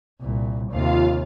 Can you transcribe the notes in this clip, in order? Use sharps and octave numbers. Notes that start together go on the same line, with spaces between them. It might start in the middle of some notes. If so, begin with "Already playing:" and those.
C2 A#2
D#2 C3 F4 F5